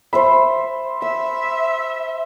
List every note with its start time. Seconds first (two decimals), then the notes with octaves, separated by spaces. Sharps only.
0.13 C5 E5 B5 E6
1.02 E5 E6